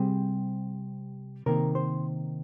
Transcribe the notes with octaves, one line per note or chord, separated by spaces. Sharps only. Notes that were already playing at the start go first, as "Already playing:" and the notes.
Already playing: C3 G3 C4 G#4
C3 D#3 A#3 A#4
C5